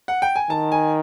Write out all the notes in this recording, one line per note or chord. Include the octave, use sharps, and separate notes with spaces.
F#5
G5
G#5
D#3 A5
G#5